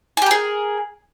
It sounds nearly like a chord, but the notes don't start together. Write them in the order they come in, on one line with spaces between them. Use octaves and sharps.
G#5 G4 A#4 G#4